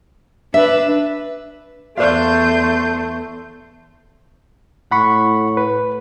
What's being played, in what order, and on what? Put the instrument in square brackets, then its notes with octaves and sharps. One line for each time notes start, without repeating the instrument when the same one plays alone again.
[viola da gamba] D4 B4 [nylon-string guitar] E5
[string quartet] E2 A3 [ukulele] C5 D5 F5 [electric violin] C6 G6
[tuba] A2 [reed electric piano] F#5 B5 C#6
[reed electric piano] B4